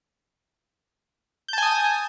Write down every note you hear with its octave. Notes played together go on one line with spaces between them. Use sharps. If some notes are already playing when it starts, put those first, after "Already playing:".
G#5 A5 D#6 G6